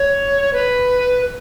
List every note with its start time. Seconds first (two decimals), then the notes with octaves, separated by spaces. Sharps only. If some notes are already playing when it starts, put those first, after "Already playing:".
Already playing: C#5
0.53 B4